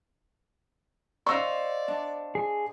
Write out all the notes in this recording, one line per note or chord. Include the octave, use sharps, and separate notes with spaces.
C5 D5 D#5 F5 C#6 E6
D4
G#4